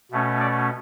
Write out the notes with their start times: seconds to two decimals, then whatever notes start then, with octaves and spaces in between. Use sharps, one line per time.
0.11 B2 A3 C#4
0.40 D5